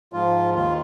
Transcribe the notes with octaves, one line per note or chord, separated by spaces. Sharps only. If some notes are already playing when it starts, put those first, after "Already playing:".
G#2 F3 F4
D#2 D#3 F4